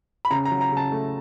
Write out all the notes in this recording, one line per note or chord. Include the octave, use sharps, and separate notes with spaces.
B5
C#3 A#5
A#5
F#3
A#5
C#3 A5
A3